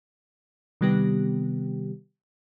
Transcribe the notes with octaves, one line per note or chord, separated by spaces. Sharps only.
C3 D#3 G3 B3 G4